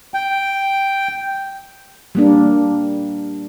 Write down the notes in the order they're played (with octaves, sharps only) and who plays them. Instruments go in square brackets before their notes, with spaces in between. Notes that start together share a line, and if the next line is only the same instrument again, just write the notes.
[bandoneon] G5
[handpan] G3 A#3 D4